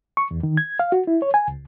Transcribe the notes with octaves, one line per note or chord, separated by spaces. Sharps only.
C#6
E2
D#3
G#6
F5
F#4
E4
C#5
G#5
C#2